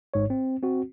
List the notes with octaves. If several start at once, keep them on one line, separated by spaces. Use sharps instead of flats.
G#1 G#2 C#5
C4
C4 F#4